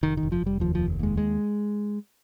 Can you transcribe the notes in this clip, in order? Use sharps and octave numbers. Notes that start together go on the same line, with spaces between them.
F1 D#3
D#3
F1
F3
F1 G3
D#2 F3
F1 F3
D#2 G#3
G#3